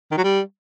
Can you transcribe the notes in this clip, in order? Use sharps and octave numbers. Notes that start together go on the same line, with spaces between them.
D#3
F#3
G3